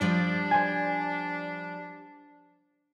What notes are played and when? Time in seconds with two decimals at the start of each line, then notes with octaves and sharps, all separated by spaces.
0.01 F3 G3 D4 D5
0.51 C5 G#5